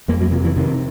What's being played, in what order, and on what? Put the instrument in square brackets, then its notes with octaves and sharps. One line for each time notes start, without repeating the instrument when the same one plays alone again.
[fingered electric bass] F2 A#3
F#3
C3 F3
E3
C3 D#3